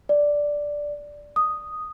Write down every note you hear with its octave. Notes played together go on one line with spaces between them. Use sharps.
D5
D#6